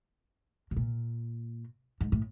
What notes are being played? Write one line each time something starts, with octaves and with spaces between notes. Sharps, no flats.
B2
A#2
G#2
A2